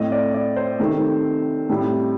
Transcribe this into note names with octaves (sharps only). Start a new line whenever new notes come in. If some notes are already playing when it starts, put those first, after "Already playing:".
Already playing: A2 A3 C4 D#5
D5
D5
C5
C3 D#3 A3 C4
A2 G3 C4